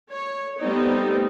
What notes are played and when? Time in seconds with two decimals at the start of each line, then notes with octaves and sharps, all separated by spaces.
0.11 C#5
0.60 G3 A3 B3 C4 D#4